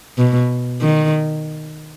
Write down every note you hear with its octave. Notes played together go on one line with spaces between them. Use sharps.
B2
D#3